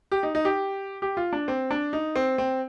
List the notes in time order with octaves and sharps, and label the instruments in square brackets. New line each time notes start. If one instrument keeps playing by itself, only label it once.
[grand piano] G4
D#4
D#4
G4
G4
F4
D4
C4
D4
D#4
C4
C4